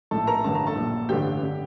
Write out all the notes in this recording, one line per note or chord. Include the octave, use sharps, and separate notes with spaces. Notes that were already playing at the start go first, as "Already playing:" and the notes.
A#1 A2 A4 A5
A#4 A#5
A1 G2 D3 A5
A#5
A4 A5
A#1 A#2
A1 G2 D3 G4 G5
D3